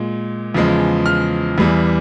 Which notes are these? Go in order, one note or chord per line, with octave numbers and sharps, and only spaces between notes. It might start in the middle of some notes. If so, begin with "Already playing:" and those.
Already playing: A#2 G#3
E2 C#3 F3 G#3
F6
E2 E3 G3